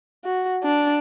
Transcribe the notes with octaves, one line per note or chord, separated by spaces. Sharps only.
F#4
D4